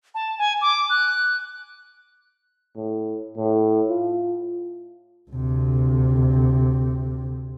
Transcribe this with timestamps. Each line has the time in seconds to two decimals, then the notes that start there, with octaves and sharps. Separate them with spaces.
0.14 A5
0.38 G#5
0.61 D6
0.90 F#6
2.76 A2
3.37 A2
3.90 F4
5.31 D2 C3